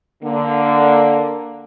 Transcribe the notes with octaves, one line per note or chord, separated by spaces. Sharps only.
D3 A#3